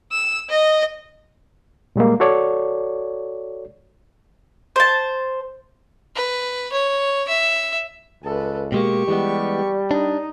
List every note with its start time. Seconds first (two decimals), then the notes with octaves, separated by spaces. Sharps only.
0.12 E6
0.50 D#5 A#6
1.96 A#2 G3 G#3 A#3
2.20 F#4 A4 C#5 D5
4.76 C5 A5
6.15 B4
6.72 C#5
7.28 E5
8.24 C#2 A4 B4
8.72 B2 G#3 A#3 G4 C#6
9.08 E3 G3 G#3 B3
9.91 D4 D#4